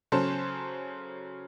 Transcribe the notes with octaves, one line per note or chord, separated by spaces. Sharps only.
C#3 F#3 C#4 A4 C5